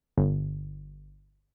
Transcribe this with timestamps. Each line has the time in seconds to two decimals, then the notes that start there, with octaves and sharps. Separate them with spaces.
0.17 G1